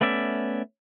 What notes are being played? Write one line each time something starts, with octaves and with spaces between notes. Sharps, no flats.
A3 B3 C#4 D5 E5